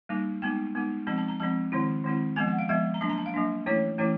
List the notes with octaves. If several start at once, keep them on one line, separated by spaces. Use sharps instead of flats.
G3 A#3 D#4
G#3 B3 D#4 G5
G#3 B3 D#4
F3 G#3 C4 A5
A5
A#5
F3 G#3 C4 A5
D#3 G#3 C4 E4
D#3 G#3 C4 E4
F3 G#3 B3 G#5
F#5
F5
F3 G#3 B3 E5
A#5
F#3 A#3 D4 A5
A#5
A5
F5
F#3 A#3 D4
E3 A3 C#4 E4 C#5
E3 A3 C#4 E4